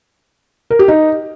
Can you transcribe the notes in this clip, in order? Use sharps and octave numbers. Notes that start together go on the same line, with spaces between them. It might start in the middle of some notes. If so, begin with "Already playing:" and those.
A#4
G4
D#4